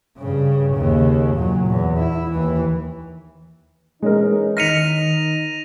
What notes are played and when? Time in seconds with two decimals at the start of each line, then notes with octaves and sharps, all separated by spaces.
0.17 G2 C#3
0.75 D#2 C#3
1.36 A#2 F#3
1.67 E2
1.98 E4
2.31 D#2 E3
4.02 E3 G#3 C#4 D#4 A#4
4.57 D#3 D#4 F6 A#6 B6 C#7 D#7 F7